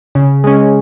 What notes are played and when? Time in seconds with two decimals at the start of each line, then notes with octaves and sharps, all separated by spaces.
0.15 C#3
0.44 G#3 C#4